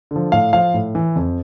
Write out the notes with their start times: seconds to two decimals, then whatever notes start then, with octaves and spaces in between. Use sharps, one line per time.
0.11 D3 F3
0.32 A2 F5
0.53 F3 F5
0.74 A2
0.95 E3
1.16 F2